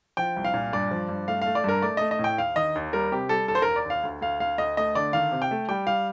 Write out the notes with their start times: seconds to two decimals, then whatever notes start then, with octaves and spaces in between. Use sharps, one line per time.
0.17 F3 G5
0.36 C2
0.44 F5
0.54 A#2
0.73 G2 D5
0.91 F3
1.09 G2
1.28 A3 F5
1.42 A3 F5
1.55 D5
1.64 G2 A#4
1.82 A3 D5
1.97 A3 D#5
2.11 D#5
2.19 A2
2.24 G5
2.38 D#2 F5
2.56 D#3 D#5
2.75 D#2
2.93 G3 A#4
3.11 C3 G4
3.29 G3 A4
3.48 D#2 A4
3.55 C5
3.62 D#2 A#4
3.76 D5
3.85 D#2
3.90 F5
4.03 D2
4.21 D2 F5
4.40 D2 F5
4.58 D2 D#5
4.77 A3 D#5
4.95 D3 D5
5.13 D#3 F5
5.32 C3
5.42 G5
5.51 A3
5.68 G3 G5
5.87 G3 F5